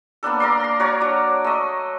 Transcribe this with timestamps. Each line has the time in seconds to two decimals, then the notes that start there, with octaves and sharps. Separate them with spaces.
0.23 A#3 B3 D4 A4
0.40 A#4 D5 C6
0.60 A#5 C6
0.79 F#4 C#5 D5 A#5
1.01 F#3 D4
1.44 A3 D#5